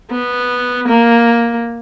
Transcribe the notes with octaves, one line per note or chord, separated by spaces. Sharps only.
B3
A#3